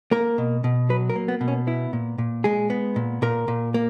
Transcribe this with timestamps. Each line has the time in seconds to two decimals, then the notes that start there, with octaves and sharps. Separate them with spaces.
0.11 A#3 A#4
0.38 B2
0.64 B2
0.89 F#3 B4
1.09 A#4
1.16 A#3
1.28 B3
1.41 B2
1.48 C#4
1.67 B3 E4
1.93 A#2
2.18 A#2
2.44 G#3 G#4
2.70 B3
2.96 A#2
3.22 A#2 A#4
3.48 A#2
3.74 A#3